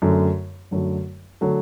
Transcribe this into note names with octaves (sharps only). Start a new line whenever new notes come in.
F#2 D3 F#3 A3
F#2 D3 F#3 A3
D3 F#3 A3